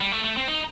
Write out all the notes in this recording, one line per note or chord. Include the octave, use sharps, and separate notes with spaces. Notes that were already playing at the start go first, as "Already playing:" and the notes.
G3
A3
A3
C4
D#4